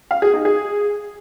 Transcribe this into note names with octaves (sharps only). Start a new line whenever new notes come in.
F5
G#4
D#4
G#4